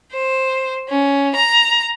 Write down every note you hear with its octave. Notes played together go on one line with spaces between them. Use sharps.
C5
C#4
A#5